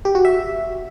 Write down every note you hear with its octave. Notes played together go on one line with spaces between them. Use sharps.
G4
F#4
E5